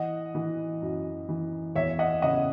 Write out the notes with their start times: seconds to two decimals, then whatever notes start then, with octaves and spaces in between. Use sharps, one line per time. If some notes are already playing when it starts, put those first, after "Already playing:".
Already playing: E3 D#5 F#5
0.35 E3
0.82 F#2
1.29 E3
1.75 E2 C#5 E5
1.99 D#5 F#5
2.22 C#3 D#5 F#5